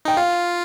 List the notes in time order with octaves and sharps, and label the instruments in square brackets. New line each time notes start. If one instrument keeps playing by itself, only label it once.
[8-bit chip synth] D#4 [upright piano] G5
[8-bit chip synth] F4 [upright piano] F5